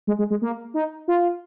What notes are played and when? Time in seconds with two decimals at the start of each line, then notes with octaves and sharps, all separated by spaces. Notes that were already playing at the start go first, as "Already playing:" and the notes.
0.07 G#3
0.19 G#3
0.30 G#3
0.42 A#3
0.74 D#4
1.08 F4